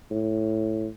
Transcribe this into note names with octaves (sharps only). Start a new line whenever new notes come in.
A2